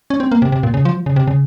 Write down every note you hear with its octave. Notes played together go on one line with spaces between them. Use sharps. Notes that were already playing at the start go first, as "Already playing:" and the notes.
C#4
C4
A#3
C3
C3
A#2
C#3
F3
C#3
C3
C#3